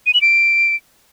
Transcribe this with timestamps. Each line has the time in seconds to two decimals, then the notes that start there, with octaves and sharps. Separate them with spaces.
0.06 D#7
0.14 F#7
0.21 D7